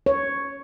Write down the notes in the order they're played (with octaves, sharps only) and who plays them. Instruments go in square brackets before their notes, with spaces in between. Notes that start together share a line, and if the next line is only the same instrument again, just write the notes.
[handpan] C#5